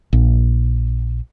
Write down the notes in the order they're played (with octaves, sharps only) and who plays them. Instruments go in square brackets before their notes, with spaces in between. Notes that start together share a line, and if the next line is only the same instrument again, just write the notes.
[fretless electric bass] A#1